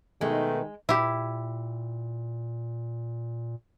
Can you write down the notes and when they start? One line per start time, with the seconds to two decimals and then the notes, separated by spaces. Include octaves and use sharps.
0.21 B2 D#3 G#3 A3 B3 D#4
0.89 A#2 E4 G4